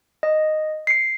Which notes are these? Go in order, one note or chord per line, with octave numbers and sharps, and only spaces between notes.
D#5
C7 C#7